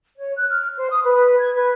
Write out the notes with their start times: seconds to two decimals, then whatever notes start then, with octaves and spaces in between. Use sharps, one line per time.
0.17 C#5
0.36 F#6
0.49 F6
0.77 C5
0.90 D#6
1.05 B4
1.39 G#6
1.55 B4